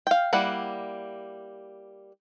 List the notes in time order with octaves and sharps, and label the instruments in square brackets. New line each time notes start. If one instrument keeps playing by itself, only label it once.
[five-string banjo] F5 G5
G3 A#3 E4 F#5